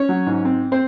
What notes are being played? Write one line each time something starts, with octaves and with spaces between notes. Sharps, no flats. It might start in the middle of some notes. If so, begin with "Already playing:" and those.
Already playing: C#4 C#5
F#3
G#2
C4
C4 C5